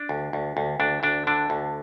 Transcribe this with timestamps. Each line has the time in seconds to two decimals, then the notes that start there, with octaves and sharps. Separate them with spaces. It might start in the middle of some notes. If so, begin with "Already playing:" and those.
Already playing: D4
0.09 D2
0.33 D2
0.57 D2
0.80 D2 D4
1.03 D2 D4
1.27 D3 D4
1.50 D2